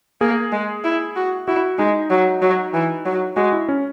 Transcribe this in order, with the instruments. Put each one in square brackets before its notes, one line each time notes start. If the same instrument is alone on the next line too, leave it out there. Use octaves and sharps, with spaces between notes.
[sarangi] A#3 [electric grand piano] G#4
[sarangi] G#3
E4
F#4
[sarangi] E4 [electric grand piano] F#4
[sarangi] G#3 [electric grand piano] D#4
[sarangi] F#3
F#3
E3
F#3
[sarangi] G#3 [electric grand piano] F#4
[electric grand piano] E4
C#4